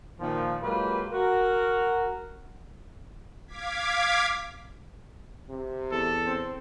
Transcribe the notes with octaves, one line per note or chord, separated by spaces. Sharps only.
A#2 D#3 F3
F#3 G#3 A#3 F4 G4 B4
F#4 A#4
F5 D6 G#6 B6
C3
E2 A4
C4